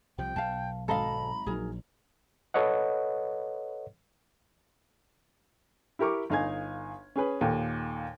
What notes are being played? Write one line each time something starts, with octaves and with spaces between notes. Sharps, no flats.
C2 C3 F3 G5
B1 F5 A5
G#1 F#3 A4 D#5 F5 A#5 B5
A#1 F#3 D#4 G#4 A#4
A4 B4 C#5 D#5 F#5
E4 G4 A#4 C#6 D6
G1 D#4 F5 G#5 G#6
C#4 G#4 B4
D#2 A#2 A4